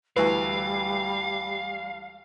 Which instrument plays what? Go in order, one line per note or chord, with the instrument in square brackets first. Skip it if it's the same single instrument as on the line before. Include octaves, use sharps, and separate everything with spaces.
[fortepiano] D2 E3 [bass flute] G3 [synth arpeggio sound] B4 [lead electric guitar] F5